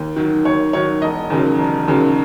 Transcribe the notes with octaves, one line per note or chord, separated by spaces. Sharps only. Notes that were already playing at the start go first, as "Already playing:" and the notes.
Already playing: D#2
D#3 F#3
D#2 C#5
D#3 F#3 C#5
E1 D#5
D#2 C#3 F#3
E1
D#2 C#3 F#3